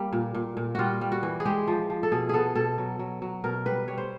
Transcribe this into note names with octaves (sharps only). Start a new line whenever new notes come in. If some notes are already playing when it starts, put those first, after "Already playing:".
Already playing: G3 A#3
A#2
A#2
A#2
G3 F4 F#4
G3
F#4
E3
G#4
G#3 G4
F3
F3
A4
B2 G#4
B3 G#4 A4
B2 A4
F#3
F#3
F#3
B2 A#4
G3 B4
G3 C#5
C5